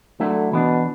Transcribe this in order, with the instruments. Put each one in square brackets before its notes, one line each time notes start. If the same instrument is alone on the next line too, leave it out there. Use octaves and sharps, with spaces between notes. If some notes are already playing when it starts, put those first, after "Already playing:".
[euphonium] D3 [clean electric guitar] F#3 A3 E4
[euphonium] B2 [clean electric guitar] E3 B3 D4